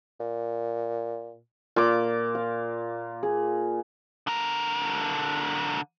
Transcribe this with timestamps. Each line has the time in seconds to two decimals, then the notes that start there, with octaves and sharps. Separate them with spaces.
0.20 A#2
1.76 A#2 F4 D6
2.35 F5
3.23 G#4
4.27 D3 A#4